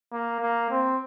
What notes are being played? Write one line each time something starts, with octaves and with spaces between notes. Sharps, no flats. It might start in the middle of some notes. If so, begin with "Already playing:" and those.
A#3
A#3
C4